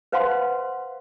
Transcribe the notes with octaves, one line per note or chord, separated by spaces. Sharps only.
B4 C5 F5 F#5 A5 C6